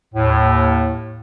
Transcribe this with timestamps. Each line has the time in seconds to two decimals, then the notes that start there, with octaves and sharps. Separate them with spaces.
0.14 D#2 A2